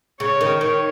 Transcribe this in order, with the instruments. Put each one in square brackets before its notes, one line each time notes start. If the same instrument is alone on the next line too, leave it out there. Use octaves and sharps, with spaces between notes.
[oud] C#3 [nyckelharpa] C#5
[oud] D#3
[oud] D#3 [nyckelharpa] C#5